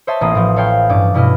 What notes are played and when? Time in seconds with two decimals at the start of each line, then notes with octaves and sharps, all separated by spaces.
0.07 C5 C#5 D#5 E5 A5 C6
0.21 A1 A#3 C4 A#5 D#6
0.35 A2 F3 C4 F#4
0.56 A4 C#5 F5 G5
0.89 G2 C#4 D6
1.14 G2 B2 E4 D#5 F6